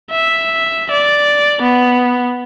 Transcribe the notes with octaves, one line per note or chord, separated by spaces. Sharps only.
E5
D5
B3